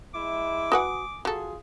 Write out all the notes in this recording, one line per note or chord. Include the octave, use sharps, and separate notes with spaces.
G#3 E4 D6
F#4 B4 F#5 G#5 D#6
F#3 F4 G#4 A4